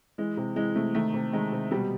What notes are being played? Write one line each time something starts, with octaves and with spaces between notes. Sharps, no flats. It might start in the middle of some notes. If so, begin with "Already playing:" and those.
E3 G#3
C3
E3 G#3
C3 A3
D#3 A3
C3
D#3 G#3
C3
B2 G3